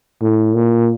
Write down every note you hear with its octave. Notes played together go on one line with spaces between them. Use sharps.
A2
A#2